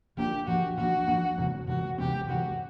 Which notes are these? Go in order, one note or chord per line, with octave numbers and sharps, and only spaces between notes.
F3 A#3 D4 G4
F3 A#3 D4 F#4
F3 A#3 D4 F#4
F3 A#3 D4
C3 E3 G#3 C4
C3 E3 G#3 C4 F#4
C3 E3 G#3 C4 G4
C3 E3 G#3 C4 F#4